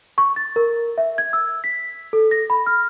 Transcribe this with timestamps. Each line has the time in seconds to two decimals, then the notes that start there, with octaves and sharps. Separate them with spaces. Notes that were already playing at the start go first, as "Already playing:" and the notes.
0.18 C#6
0.36 A6
0.56 A#4
0.98 E5
1.18 G#6
1.33 E6
1.64 B6
2.13 A4
2.31 A#6
2.50 B5
2.66 F6